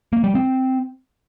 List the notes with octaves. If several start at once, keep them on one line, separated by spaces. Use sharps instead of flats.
A#3
G3
C4